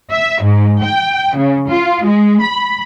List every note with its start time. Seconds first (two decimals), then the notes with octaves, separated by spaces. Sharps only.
0.11 E5
0.41 G#2
0.81 G5
1.36 C#3
1.69 F4
2.03 G#3
2.42 B5